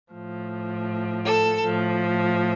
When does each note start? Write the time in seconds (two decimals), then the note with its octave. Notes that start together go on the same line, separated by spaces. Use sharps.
0.13 A2 F3
1.26 A4
1.63 A2 F3